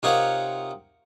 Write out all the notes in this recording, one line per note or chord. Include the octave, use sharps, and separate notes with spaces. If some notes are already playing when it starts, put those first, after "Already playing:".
C3 D#4 F4 A#4 C#5 F#5